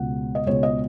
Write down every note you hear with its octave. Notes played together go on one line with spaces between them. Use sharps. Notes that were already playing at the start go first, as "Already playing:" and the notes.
Already playing: C#2 B2 G#3 F#5
D#5
C#2 B2 G#3 C#5
D#5